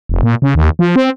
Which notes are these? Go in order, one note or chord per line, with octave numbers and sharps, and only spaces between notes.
F1
A#2
C#3
D#2
F3
C4